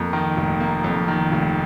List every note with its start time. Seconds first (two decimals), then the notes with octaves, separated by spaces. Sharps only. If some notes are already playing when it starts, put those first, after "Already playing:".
Already playing: F2 A#3
0.13 D#3
0.37 F1
0.60 A#3
0.84 F2
1.08 D#3
1.32 F1